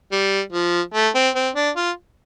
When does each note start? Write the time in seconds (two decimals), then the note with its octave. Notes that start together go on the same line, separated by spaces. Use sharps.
0.12 G3
0.52 F3
0.94 A3
1.15 C4
1.35 C4
1.56 D4
1.76 F4